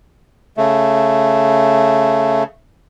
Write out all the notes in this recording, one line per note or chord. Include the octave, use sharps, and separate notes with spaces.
C#3 A3